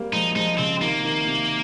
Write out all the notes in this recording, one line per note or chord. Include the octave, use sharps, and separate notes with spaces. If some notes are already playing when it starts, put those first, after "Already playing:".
Already playing: G3 A#3 C4
F3 G#3 D#4
F3 G#3 D#4
C#3 C4
C3 D#3 A#3
C3 D#3
C3